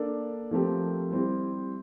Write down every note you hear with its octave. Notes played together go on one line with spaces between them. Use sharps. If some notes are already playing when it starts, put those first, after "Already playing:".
Already playing: A#3 D4 A4 D5
F3 A3 C4 G4 A#4
G3 C4 E4 G4